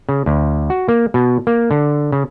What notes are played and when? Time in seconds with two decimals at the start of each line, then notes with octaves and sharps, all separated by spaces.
0.09 C#3
0.26 D2
0.70 F#4
0.88 A#3
1.14 B2
1.47 A#3
1.71 D3
2.12 C#3